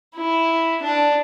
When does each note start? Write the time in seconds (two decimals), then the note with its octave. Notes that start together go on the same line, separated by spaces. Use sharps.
0.16 E4
0.83 D4